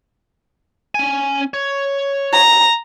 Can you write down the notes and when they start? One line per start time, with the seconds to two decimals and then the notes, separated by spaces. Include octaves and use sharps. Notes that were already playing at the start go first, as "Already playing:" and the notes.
0.95 C#4 G#5
1.54 C#5
2.33 A#5